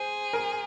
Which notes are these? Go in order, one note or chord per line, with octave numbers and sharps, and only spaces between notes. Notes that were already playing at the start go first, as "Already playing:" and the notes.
Already playing: G#4 C5
A#4